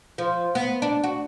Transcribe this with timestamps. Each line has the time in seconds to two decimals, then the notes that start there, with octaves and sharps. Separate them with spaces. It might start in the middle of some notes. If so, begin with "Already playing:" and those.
0.18 F3
0.55 B3
0.82 D4
1.04 F#4